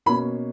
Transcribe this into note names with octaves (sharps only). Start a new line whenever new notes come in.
B2 A#3 C#4 B5